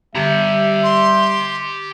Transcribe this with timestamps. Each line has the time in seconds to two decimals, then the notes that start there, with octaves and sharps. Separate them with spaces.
0.15 G3 G4 E5 A#5
0.84 C6